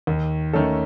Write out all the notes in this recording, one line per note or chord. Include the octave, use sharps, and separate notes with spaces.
D#2
D#3 A3 C#4 A4